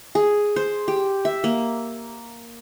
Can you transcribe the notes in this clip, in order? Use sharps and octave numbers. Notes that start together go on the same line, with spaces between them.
G#4
C5
G4
E5
A#3